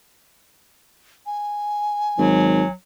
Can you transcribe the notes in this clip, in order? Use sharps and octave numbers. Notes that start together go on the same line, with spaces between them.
G#5
G#1 F#3